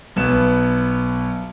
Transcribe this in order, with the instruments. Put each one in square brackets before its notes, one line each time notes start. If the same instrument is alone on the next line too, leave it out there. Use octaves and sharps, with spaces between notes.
[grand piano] B1 B3 E7